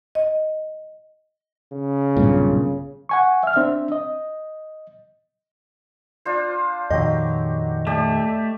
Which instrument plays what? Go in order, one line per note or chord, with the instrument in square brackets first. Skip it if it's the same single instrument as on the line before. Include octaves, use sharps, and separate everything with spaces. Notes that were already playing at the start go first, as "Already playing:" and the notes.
[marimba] D#5
[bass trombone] C#3
[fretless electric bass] B1 G2 A#2
[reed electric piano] F#5 G#5 C#6
E5 F6
C4 D4 E5
D#5
[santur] D4 F4 C5
[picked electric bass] F2 A#2 D#3 [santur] F#3 G4 [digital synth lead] D#5
[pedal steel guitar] A3 [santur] G4 D5